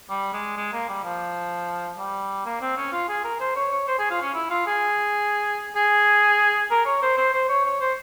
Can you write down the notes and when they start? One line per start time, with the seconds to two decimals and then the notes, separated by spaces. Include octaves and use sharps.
0.10 G3
0.33 G#3
0.57 G#3
0.73 A#3
0.89 G3
1.04 F3
1.99 G3
2.46 A#3
2.61 C4
2.77 C#4
2.92 F4
3.08 G#4
3.24 A#4
3.40 C5
3.56 C#5
3.72 C#5
3.87 C5
3.99 G#4
4.10 F4
4.22 C#4
4.34 E4
4.50 F4
4.66 G#4
5.76 G#4
6.71 A#4
6.86 C#5
7.02 C5
7.17 C5
7.33 C5
7.49 C#5
7.65 C#5
7.81 C5